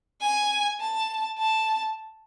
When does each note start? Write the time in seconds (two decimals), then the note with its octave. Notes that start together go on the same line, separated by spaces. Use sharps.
0.21 G#5
0.80 A5
1.38 A5